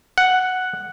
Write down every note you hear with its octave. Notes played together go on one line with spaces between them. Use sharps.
F#5